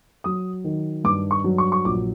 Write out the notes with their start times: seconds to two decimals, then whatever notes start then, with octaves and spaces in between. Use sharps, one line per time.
0.24 F#3 D#6
0.64 D#3
1.04 G2 D6
1.31 C#6
1.44 F#3
1.58 C#6
1.72 C#6
1.85 A#1 D6